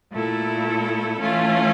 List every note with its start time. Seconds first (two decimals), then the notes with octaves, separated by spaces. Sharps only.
0.11 A#2 A3 E4 A4
1.21 E3 A3 C#4 F4